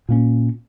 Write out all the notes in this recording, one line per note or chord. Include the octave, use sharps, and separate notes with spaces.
A#2 A#3 C#4